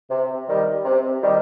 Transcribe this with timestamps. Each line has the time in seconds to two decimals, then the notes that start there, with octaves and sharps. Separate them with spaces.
0.10 C3
0.47 D#3 G3
0.84 C3
1.22 D#3 G3